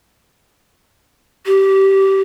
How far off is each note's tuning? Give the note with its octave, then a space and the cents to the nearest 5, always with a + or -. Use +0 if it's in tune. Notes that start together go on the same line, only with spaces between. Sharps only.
G4 -20